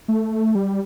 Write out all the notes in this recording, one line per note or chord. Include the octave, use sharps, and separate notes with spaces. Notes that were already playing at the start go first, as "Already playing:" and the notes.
A3
G3